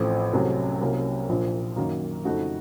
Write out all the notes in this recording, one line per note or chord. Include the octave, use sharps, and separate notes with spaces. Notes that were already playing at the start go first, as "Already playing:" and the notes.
Already playing: A1 A2 F3 A3 C4
C2 C3 F#3 A3 C#4
C2 C3 F#3 A#3 C#4
A#1 A#2 F3
F#2 D#3 F#3 A#3
F2 C#3 A3 D#4 F#4